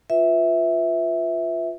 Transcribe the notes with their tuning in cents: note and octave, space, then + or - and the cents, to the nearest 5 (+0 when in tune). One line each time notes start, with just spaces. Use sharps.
F4 +0 B4 +0 E5 -10